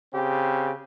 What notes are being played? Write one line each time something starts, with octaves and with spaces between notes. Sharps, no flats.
C#3 C4 G4